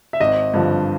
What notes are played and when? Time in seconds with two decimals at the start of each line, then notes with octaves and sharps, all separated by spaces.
0.13 E5
0.20 G#1 D#5
0.54 G2 D3 F3